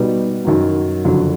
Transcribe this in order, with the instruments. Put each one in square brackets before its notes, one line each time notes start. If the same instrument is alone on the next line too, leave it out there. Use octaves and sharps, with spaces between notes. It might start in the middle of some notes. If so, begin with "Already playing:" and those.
Already playing: [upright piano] B2 G3 B3 D#4
F#2 D#3 F#3
F#1 F2 D3 F#3